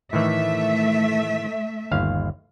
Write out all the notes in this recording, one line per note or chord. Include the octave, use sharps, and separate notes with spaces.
A2 D#3 E3 A3 E5
G1 D#2 F5